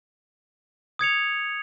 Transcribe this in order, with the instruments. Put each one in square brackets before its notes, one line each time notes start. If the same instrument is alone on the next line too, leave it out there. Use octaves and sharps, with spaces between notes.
[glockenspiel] D#6 G#6 C#7 F7